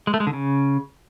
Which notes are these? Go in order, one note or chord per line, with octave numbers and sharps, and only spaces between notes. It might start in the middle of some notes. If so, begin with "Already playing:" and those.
G#3
A3
G#3
D3
C#3